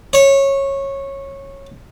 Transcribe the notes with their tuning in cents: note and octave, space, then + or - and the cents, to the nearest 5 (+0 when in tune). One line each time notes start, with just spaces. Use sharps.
C#5 -15